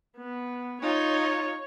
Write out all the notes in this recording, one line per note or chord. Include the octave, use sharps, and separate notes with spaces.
B3
D#4 F4 C#5